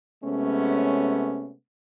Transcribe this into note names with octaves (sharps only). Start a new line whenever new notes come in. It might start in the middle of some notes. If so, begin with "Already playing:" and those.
C3 G#3 A3 B3 C#4